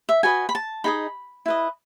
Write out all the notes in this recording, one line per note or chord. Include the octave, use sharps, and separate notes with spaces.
E5
F#4 B4 D#5 G#5
B5
A5
D#4 G#4 D#5 B5
E4 B4 D#5